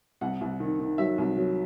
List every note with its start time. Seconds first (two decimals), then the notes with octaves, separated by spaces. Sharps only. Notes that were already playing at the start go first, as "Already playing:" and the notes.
0.21 C2 F#5
0.41 C2
0.60 D#3
0.80 D#3
0.98 F#3 E5
1.18 C2
1.37 F#3